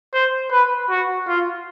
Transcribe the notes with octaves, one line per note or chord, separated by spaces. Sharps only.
C5
B4
F#4
F4